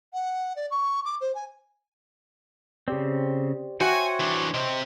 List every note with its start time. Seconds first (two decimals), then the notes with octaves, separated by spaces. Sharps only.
0.13 F#5
0.56 D5
0.71 C#6
1.05 D6
1.21 C5
1.35 G#5
2.88 C#3 C4 G4 C5 D5
3.81 F#4 C5 C#5 E5 G5 G#5
4.20 E3 D4
4.54 C3 C4 D#5